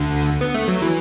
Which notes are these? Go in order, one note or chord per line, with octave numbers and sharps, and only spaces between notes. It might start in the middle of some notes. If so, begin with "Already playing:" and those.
Already playing: D2 D3
B3
A3
F#3
E3